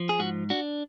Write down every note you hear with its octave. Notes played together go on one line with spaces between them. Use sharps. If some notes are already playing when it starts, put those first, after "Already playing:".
Already playing: F3
G#4
G#2 F#4
D4 F#4